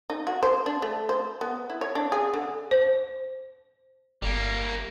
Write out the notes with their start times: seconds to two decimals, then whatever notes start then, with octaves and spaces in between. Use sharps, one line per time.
0.10 D#4
0.27 F#4
0.43 C5
0.66 D4
0.82 A3
1.09 C5
1.41 B3
1.70 E4
1.81 C#5
1.95 D4
2.12 G#4
2.34 D3
2.71 C5
4.22 G1 G3 A#3